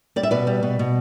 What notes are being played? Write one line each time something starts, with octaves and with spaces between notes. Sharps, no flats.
G3 D5
E5
B2 B4 D5
G3
B2
B2